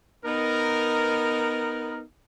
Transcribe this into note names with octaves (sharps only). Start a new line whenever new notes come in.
B3 D#4 A#4